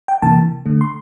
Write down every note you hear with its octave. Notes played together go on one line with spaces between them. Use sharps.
G5
C3 E3 A#3 A5
D3 A3
C6